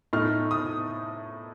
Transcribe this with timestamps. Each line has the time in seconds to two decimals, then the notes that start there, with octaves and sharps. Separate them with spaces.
0.13 A2 A3 D#4 F6
0.51 D#6